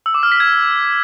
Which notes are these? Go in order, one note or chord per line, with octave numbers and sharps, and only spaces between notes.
E6
D6
F6
B6
G#6